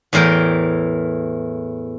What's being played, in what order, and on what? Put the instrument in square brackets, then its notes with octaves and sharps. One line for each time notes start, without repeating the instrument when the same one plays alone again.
[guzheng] E2 A2 E3 A#4 G5